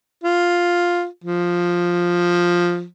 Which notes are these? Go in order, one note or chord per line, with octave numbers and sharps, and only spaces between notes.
F4
F3